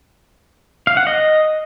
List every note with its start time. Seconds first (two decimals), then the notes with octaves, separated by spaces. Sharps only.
0.87 F5
0.97 F#5
1.07 D#5